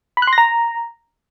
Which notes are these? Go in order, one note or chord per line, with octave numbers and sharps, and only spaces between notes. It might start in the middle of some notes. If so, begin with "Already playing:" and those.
B5
F#6
C6
A#6
A#5